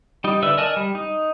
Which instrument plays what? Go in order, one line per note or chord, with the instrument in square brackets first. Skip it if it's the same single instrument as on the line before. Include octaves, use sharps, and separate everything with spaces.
[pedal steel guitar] G3 D#4
D3 B4 D5 E5 E6
A#4 D5 D#5 G#5 A5
G3
D#4